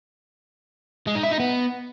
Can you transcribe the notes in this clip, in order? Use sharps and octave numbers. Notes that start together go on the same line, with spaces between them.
G#3
D#4
E4
D#4
B3